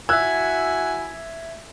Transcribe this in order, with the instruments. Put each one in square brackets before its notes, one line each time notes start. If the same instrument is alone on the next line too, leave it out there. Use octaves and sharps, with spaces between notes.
[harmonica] E4 F#4 G#5 [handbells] E5 G#6 [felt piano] E6 F#6